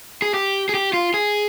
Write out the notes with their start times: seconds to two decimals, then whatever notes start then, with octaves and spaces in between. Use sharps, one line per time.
0.22 G#4
0.34 G4
0.69 G#4
0.74 G4
0.93 F4
1.14 G#4